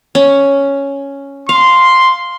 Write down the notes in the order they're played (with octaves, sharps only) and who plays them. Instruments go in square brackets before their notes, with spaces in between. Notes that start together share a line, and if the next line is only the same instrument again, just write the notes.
[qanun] C#4
[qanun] F5 [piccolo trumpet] C6